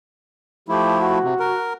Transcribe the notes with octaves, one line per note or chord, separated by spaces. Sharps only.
F3 A3 E4 G4
F#4
C3
A#4